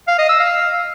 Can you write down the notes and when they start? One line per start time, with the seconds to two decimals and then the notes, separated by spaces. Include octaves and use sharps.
0.08 F5
0.18 D#5
0.29 E6
0.40 F5